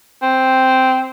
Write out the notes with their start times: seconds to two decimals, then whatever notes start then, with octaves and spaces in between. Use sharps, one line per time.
0.22 C4